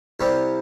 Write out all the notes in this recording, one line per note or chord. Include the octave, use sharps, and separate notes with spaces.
C2 C3 G3 C4